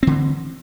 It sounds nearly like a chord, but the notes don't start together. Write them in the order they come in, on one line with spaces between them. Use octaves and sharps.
C4 D3 E3